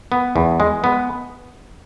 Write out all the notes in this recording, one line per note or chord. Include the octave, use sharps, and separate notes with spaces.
B3
E2
G#3
B3